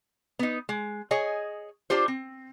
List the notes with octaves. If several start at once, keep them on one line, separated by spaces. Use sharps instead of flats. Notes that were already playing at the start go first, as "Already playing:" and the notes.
B3 D#4
G#3
G#4 C#5 D#5 G#5
D4 F4 G4 C5
C4